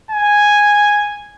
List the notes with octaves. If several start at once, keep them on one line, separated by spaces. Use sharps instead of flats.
G#5